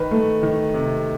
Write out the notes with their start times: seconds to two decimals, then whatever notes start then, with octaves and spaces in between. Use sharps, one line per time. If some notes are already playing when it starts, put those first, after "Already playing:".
Already playing: D#3 B4
0.11 A3
0.43 D#3
0.74 C3